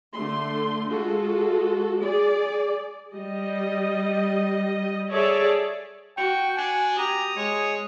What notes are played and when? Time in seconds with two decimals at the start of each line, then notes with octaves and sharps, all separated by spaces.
0.14 D3 A3 C6
0.90 G#3 F4 F#4 A4
2.01 G#4 D5
3.14 G3 D#5
5.09 G#4 A4 C#5 D5 E5
6.17 F#4 G5 C#6
6.58 D4 G#5
6.98 G4 A#5 D#6
7.37 G#3 C#5